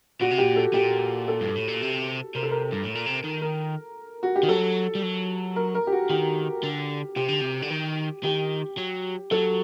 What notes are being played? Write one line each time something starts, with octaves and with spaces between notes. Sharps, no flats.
A#2 F#4
C3
A#2 G4
A4
A#2 G4
A4
G2
A2
A#2
C3
C3 A#4
A4
A#4
G2
A2
A#2
C3
D#3
A#4
F#4
G4
D#3
F#3 A4
G3
F#3
A#4
A#4
G4
F#4
D#3 G4
D3
C3 G4
D3
C3
D3
D#3
D#3 G4
F#3
F#3 A4